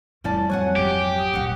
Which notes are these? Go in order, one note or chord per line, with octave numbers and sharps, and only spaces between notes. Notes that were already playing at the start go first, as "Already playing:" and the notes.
F2 A2 E3 G3 C#4 D5 A5
F2 F#3 C#5 F#5 G#5 F#6
G#1 G4
D#6
D#1 A#2 F#4 F#5